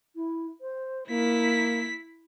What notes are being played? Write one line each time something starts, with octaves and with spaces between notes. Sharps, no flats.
E4
C5
A#3 E4 B6